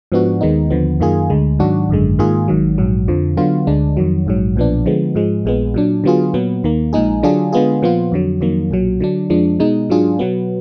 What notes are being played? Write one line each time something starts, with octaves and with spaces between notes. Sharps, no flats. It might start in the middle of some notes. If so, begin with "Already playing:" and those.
G#2 F3 B3 D4 F#4
D#2 D#3 G#3 B3 D#4
D#2 D3 F3 B3
F#2 D#3 A#3 F4 G#4
D2 D3 G#3
G#2 D#3 F#3 D4 F#4
G#1 F#2 D3 G#3
G#2 D#3 A#3 F4 G#4
G#1 G#2 D#3 F#3
A#1 G#2 F#3
F2 D3 F3
D3 F#3 B3 F4
D2 D3 G#3 D4
F2 D#3 F#3
A#1 G#2 F#3
B1 A#2 F3 B3 D4
D3 F3 G#3 B3
G#2 F3 G#3
A#1 A#2 G#3 B3
A#2 F#3 D4
D3 F#3 B3 F4 G#4
A#2 F#3 B3
D#2 D#3 A#3
A#1 A#2 G#3 D#4 G#4
D3 F#3 D4 F4 G#4
D3 G#3 B3 F4 G#4
A#2 F3 B3 F4
F2 D3 F#3
F2 D#3 F#3 A#3
B1 A#2 F#3
D3 F#3 D4
F2 F3 G#3 D4
B2 G#3 D#4
G#2 F#3 D4 F4 G#4
B2 F#3 B3